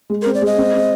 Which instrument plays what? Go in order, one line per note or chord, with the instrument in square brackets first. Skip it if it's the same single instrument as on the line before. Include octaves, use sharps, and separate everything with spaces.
[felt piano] G#3
[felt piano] C4 [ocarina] A#4
[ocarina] D5
[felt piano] G#3 [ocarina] D#5
[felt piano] C4
C4